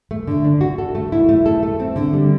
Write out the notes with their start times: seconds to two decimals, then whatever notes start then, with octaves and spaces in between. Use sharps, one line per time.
0.11 A3
0.28 D3
0.45 D4
0.61 F#4
0.78 A4
0.95 A3
1.12 E4
1.29 A3
1.46 A4
1.63 A3
1.80 C4
1.96 D3
2.13 G3